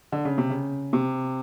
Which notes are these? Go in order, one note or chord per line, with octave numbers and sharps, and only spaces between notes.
D3
C#3
C3
C#3
C3